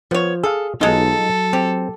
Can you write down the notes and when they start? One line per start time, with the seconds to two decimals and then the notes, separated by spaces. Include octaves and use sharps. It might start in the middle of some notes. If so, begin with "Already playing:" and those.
0.11 F3 B3 C#5
0.43 G#4 A4 F5
0.81 B1 G#3 D#4 F4 A4
1.19 F#3
1.53 C4 G4